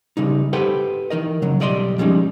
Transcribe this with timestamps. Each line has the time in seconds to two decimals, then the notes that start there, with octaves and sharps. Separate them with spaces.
0.17 C#3 G3 D#4
0.53 G4 A4 B4 C5 F#5 G5
1.10 E3 D#4 A#4 D#5
1.42 C#3 F#3
1.60 B1 G3 D5 D#5 F#5 C6
1.98 F3 G3 G#3 C#4 D#4